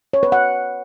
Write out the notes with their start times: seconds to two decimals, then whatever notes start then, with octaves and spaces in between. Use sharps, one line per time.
0.13 C#5
0.23 B4
0.32 F#5